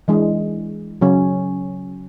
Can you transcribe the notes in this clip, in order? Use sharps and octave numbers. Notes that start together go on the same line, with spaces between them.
E3 G#3 D4 G#4
C#3 F#3 C#4